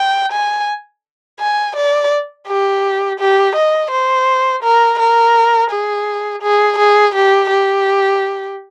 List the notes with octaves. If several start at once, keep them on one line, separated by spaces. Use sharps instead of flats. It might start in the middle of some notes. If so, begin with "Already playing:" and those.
Already playing: G5
G#5
G#5
D5
G4
G4
D#5
C5
A#4
A#4
G#4
G#4
G#4
G4
G4